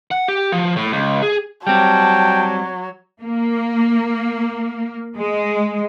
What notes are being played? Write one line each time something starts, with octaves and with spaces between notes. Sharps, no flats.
F#5
G4
F3
A2
C#2
G#4
F#3 G3 C4 G5 A5
A#3
G#3